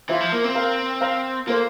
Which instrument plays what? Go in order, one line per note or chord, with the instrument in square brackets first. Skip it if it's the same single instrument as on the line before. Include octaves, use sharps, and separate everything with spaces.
[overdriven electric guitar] E3 [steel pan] F4 C5 E5
[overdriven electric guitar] F3
A#3
C4
[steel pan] A#4 F5 A#5
C5 F5 A#5
[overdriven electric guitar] A#3 [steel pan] F4 A4 C5 F5